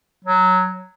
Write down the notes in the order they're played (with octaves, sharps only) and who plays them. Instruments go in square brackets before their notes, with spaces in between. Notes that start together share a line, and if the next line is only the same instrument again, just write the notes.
[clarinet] F#3